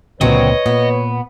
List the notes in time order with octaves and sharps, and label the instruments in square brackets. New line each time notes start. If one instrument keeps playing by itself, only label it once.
[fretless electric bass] C#2 A#2 D3 [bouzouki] F#3 C4 [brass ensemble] B4 C#5 [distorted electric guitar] D#5
[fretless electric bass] A#2 [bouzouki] B3